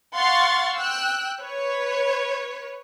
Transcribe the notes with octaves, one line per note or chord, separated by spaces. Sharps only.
F5 F#5 C6 C#6 A6
G5 E6 F#6
B4 C#5